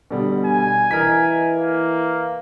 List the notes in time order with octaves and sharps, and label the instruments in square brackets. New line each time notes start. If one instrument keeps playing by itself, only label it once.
[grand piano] B2 D3 G3
[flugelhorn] G#5
[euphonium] E3 [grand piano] A#4 D#5 B6
[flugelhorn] A#3